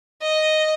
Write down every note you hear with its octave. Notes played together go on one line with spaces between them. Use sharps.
D#5